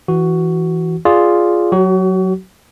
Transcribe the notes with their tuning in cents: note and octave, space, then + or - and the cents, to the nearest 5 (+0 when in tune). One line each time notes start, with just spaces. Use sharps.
E3 +0 F#4 +5
F4 +0 G#4 +0 D5 +0
F#3 +0 F#4 +35